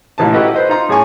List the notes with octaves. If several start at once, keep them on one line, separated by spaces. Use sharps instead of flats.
A1 A#2 E3 D#4 A5
E4 F#4 G4 A4 B4 D#5
B4 C5 D#5
D#4 F4 A#5 C6
A2 G#4 C#5 G#5 C#6